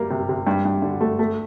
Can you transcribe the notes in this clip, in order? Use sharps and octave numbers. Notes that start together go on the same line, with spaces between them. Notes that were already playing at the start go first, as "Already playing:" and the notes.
Already playing: G3 A#3
C3
C3
G2
G2
D3
A3
A3